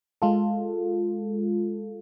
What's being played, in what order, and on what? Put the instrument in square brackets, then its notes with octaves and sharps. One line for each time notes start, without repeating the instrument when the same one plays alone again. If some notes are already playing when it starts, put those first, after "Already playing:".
[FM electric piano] G#3 F4 A4